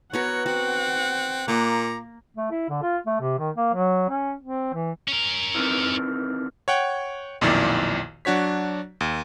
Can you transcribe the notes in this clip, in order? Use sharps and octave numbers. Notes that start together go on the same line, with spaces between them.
B3 F#4 A#4 C#5 F#5
C4 F#4
A#2 A#3 A#5 D6
A3
E4
D3
F4
A3
C3
D#3
A#3
F#3
C#4
C4
E3
C#4 A#4
C3 D#3 E3
C#5 F#5 G5
B1 F2 A#2 D#3 E4 D5
F#3 D4 F#4 C#5 B6
D#2